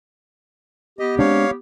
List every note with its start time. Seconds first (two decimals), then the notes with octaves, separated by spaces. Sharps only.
0.99 B3 G4 D#5
1.19 G#3 C4 D4 C#5 F5